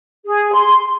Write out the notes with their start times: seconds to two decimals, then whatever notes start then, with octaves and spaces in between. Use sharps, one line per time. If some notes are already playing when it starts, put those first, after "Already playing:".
0.25 G#4
0.53 C6